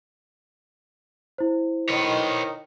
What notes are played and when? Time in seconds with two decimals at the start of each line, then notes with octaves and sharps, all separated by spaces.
1.38 E4 C5
1.89 D#3 B4 C#5